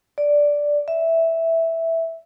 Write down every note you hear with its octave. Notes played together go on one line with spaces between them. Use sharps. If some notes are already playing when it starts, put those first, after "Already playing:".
D5
E5